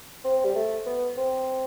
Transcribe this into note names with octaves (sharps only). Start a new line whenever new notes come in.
C4
G3
A3
B3
C4